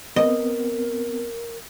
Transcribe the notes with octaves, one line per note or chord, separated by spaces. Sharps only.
B3 C4 A#4 D#5